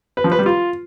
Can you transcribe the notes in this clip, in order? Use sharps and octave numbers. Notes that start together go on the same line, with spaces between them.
B4
F3
B4
G3
F4